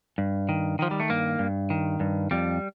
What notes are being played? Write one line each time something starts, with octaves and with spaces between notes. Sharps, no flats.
G2
D#3
D#3 F3
G3
A3
G2 A#3
G2
D#3
G2
F2 G3